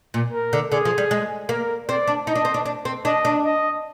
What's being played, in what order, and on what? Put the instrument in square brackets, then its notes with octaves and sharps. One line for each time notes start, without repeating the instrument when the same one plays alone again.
[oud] A#2
[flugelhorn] A#4
[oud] D3
[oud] D3 [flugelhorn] G#4
[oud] F3
G3
G#3
[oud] A#3 [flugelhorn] A#4
[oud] C4 [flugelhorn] D5
[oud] D4
[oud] D#4 [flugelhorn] D#5
[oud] D4
C4
D4
D4
C4
[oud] D4 [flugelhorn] D#5
[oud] D4
[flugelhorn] D#5